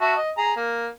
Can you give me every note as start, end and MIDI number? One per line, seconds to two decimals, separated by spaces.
0.01 0.15 66
0.01 0.15 76
0.01 0.15 81
0.17 0.31 75
0.37 0.53 68
0.37 0.53 82
0.56 0.87 58